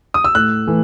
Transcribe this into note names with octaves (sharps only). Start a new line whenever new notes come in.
D#6
E6
A2 F#6
E3 A3